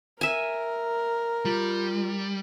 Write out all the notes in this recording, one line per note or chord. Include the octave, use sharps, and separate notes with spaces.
A#4 E5 G#5
G3 F4